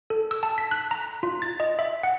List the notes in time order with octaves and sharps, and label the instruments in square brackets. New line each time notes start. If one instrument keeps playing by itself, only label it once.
[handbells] A4
E6
A5
B6
F#6
A#5
F4
A6
D#5
E5
F#5